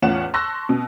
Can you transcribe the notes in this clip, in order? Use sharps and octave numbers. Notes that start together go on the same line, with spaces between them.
E2 A2 C#4 F4 F#5 E7
A5 C6 C#6 E6 F#6 A#6
B2